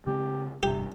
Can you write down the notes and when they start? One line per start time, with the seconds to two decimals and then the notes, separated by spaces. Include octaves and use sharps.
0.07 C#3 G#3 C4 G4
0.63 E1 G2 C3 G4